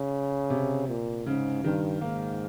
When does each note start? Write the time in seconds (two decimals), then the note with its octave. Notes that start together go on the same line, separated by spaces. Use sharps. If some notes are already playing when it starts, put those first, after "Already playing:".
Already playing: C#3
0.50 C3
0.87 A#2
1.26 G#2 C#3
1.63 G2 D#3
2.01 G#2 A#3